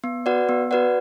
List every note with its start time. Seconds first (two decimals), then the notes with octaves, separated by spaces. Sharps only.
0.04 B3
0.26 F#4 B4 D5 F#5
0.49 B3
0.71 F#4 B4 D5 F#5